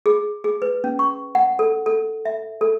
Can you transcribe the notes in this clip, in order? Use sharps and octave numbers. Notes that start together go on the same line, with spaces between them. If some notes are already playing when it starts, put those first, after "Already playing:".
G#4
G#4
B4
C#4
C#6
F#5
A4
A4
E5
A4